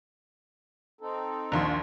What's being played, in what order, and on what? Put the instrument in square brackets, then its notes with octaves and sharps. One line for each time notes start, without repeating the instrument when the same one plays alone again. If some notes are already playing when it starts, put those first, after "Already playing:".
[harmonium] C4 D#4 A4
[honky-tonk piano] A#1 D#2 C6